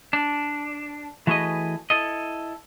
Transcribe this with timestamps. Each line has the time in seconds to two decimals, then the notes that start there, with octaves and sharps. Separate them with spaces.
0.13 D4
1.27 E3 A3 F#4 G#4 B4 D#5
1.90 E4 A4 D#5